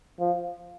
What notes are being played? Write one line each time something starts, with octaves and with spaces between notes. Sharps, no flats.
F3